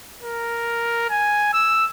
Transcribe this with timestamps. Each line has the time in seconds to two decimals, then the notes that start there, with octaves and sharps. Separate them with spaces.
0.22 A#4
1.10 G#5
1.53 E6